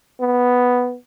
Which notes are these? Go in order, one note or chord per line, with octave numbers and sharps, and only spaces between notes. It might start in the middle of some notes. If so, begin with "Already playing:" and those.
B3